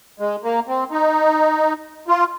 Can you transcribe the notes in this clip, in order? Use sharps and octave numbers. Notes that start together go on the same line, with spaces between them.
G#3
A#3
C4
D#4
F4